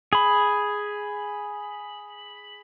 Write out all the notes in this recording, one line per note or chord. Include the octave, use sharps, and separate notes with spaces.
G#4 B5